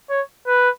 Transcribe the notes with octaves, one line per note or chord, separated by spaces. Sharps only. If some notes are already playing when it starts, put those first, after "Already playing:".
C#5
B4